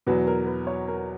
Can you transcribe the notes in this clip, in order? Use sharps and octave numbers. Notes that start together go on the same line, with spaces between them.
E2 B2 F#3 B4
A#4
B4
C#5
A#4